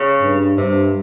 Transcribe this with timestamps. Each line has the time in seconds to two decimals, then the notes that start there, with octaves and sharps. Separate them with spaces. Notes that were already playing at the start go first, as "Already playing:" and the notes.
Already playing: C#3
0.21 G2
0.57 G2 C3